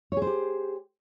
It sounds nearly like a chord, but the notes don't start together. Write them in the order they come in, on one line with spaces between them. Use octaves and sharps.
C#5 G#4 C5 G4